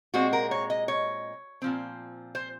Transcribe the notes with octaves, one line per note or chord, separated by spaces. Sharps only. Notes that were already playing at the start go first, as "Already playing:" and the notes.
A#2 G#3 C4 F#4
A#4
C#5
D#5
C#5
A#2 F3 C4
C5